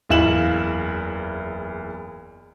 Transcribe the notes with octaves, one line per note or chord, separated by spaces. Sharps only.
F#1 E2 E4 F4 E7 F#7